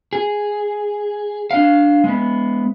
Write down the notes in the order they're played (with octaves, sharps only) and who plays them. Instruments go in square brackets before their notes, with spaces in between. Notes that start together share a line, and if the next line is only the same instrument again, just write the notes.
[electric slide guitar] G#4
D4 F5
G#3 B3